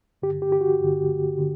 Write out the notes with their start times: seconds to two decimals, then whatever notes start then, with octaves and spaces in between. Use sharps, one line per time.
0.22 G2 D3 G4
0.42 G4
0.52 G4
0.61 F#4
0.80 G2 D3
1.38 D3